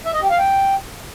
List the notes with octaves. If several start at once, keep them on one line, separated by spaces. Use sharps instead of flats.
E5
D#5
G4
F5
G5